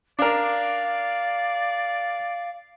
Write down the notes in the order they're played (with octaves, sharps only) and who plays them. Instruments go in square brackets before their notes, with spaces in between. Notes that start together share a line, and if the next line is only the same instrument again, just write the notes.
[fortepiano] D4 A#4 [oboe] D5 [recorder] F5